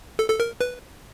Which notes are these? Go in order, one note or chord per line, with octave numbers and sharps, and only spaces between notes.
A4
A4
A#4
B4